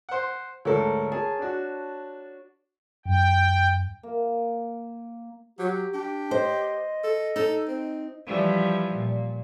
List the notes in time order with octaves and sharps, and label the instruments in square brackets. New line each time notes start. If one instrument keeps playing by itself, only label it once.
[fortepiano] C5 F#5
[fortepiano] D2 G#2 A4 [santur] A#4 C#5
[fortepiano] G#4 [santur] A5
[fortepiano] D4 F#4
[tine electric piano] F#2 [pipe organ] G5
[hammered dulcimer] A#3
[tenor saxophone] F#3 [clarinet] G4
[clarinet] D4 [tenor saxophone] G4
[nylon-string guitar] C5 [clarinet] D#5
[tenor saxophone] A4
[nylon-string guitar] D#4 [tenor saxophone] A4
[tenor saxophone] C4
[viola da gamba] E3 F3 G3
A#2